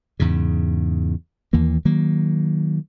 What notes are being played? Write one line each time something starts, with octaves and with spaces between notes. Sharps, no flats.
E2 G#2 C#3
D#2 E3 A#3
D#3 F#3 A#3